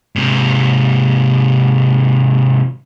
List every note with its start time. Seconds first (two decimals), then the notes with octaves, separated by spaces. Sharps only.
0.16 G#2 C3